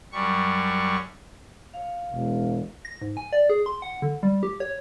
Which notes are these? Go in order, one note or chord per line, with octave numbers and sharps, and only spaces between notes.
F#2 G3 C#6
C#5 F5
E1
A#6
G#2
G#5
D5
G#4
C6
F#5
D3
G3
G4
C#5